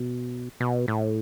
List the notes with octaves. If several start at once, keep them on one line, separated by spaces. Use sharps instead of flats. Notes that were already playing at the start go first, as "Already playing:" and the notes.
Already playing: B2
B2
A2